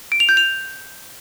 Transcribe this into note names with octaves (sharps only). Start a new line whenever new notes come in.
D7
F7
G6
F7